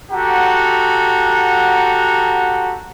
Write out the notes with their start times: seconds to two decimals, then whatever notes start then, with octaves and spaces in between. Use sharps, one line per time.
0.12 F#4 G4 A4 F#5 A#5